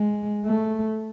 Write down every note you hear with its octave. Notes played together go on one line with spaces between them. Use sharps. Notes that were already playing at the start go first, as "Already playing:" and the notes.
Already playing: G#3
A3